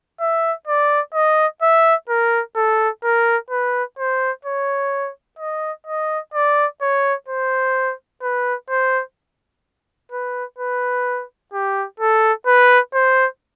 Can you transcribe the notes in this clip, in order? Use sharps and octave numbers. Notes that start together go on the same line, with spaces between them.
E5
D5
D#5
E5
A#4
A4
A#4
B4
C5
C#5
D#5
D#5
D5
C#5
C5
B4
C5
B4
B4
G4
A4
B4
C5